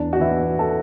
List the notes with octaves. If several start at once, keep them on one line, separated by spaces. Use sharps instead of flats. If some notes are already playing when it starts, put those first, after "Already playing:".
Already playing: E2 D4
F#4
E3 E4
A4